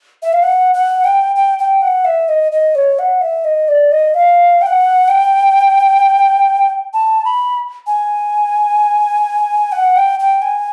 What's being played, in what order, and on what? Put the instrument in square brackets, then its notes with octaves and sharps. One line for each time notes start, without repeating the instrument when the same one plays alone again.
[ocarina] E5
F5
F#5
F#5
G5
G5
G5
F#5
E5
D#5
D#5
C#5
F#5
E5
D#5
D5
D#5
F5
G5
F#5
G5
A5
B5
G#5
F#5
G5
G5
G#5